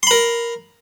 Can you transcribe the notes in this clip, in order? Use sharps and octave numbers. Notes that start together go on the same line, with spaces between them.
A#4 B5 C6